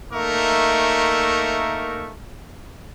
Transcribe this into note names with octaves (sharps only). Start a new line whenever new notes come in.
A3 A#3 D#4 A#4 E5 C#6